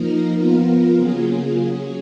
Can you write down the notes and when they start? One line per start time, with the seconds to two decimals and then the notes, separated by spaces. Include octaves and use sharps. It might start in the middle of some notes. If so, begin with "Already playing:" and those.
Already playing: F3 A#3 D#4 A#4
0.37 F3 B3 F4 A#4
0.96 C#3 F#3 A#3 F4 G#4
1.57 F#3 C#4 G#4